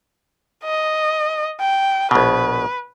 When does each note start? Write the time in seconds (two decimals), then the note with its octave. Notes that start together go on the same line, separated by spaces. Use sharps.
0.64 D#5
1.60 G5
2.11 A#1 B2 B4